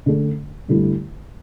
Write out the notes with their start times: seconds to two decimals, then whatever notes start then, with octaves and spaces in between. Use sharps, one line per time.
0.06 D3 A3 D4
0.68 G2 D3 A3 E4 G4